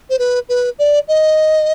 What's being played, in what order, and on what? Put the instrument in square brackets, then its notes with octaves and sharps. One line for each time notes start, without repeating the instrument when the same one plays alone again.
[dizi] C5
B4
B4
D5
D#5